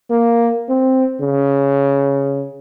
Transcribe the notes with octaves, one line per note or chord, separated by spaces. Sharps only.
A#3
C4
C#3